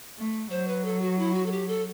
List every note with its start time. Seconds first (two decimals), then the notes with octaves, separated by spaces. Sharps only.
0.17 A3
0.51 F#3 C5
0.68 B4
0.85 A4
1.02 F#4
1.19 E4
1.34 F#4
1.46 A4
1.52 G4
1.68 A4